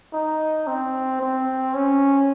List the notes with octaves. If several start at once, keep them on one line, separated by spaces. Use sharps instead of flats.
D#4
C4
C4
C#4